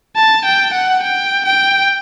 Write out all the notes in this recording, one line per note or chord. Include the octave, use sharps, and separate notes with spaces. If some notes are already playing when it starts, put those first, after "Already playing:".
A5
G5
F#5
G5
G5